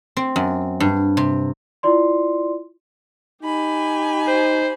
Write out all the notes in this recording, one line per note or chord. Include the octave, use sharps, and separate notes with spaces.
C4
F#2
G2
C3
E4 F4 D5 C6
D#4 G4 G#5 B5
C5